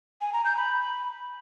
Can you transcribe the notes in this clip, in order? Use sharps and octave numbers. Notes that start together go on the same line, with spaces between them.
G#5
A#5
G6
B5